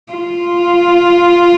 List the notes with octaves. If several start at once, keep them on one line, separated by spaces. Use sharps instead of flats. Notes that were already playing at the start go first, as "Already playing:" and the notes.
F4